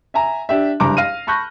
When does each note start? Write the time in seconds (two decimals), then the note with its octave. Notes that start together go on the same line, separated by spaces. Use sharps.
0.14 E5 G#5 A#5
0.49 D4 G4 E5
0.80 F#1 G2 A#5 D6
0.97 F5 F6 A#6 D#7
1.27 A5 B5 C#6 F#6 G6 A#6